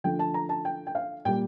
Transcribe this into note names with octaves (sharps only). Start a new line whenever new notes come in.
D3 F3 A3 G5
A5
A#5
A5
G5
G5
F5
A#2 G3 A#3 G5